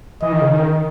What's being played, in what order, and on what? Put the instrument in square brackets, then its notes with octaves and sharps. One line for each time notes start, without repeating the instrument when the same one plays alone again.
[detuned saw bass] E3 [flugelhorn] D#5
[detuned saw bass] D#3
C#3
D#3